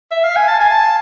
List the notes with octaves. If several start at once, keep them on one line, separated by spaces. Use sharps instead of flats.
E5
F5
G#5
A5
G#5
A5